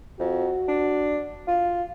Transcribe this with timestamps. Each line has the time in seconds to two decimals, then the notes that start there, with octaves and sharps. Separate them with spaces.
0.20 F2 F#4
0.68 D4
1.48 F4